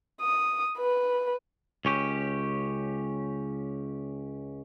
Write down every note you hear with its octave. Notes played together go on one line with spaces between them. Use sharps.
D#6
B4
C#2 C#4 G4